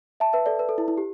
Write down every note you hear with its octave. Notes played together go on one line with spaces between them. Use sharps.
E5 A5
B4 E5
A4 D5
B4
A4
E4
E4
G4